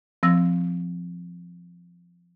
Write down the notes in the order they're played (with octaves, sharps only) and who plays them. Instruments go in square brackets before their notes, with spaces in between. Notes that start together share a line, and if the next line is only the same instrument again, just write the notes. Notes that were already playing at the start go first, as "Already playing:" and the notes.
[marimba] F3 C4 E6 A#6